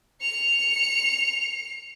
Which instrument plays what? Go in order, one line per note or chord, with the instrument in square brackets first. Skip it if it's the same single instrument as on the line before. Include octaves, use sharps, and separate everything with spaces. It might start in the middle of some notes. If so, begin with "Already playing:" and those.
[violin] C#7 F7